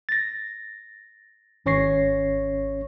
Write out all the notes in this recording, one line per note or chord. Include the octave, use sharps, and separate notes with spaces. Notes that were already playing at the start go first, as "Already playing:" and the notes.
A6 A#6
G#1 C#4 C#5 C#6 A#6 C7